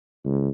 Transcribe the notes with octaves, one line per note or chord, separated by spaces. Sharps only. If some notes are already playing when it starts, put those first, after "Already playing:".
C#2